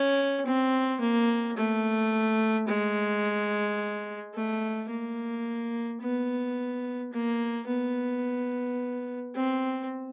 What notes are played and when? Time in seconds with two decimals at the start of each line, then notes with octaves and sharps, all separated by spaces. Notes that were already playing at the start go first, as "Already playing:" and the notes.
Already playing: C#4
0.46 C4
1.01 A#3
1.57 A3
2.68 G#3
4.35 A3
4.90 A#3
6.01 B3
7.13 A#3
7.67 B3
9.35 C4